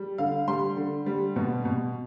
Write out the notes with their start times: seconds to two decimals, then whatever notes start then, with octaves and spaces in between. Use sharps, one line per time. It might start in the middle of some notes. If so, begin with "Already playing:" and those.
Already playing: G3
0.18 D3 F5
0.48 G3 C6
0.77 D3
1.06 G3
1.36 B2
1.65 B2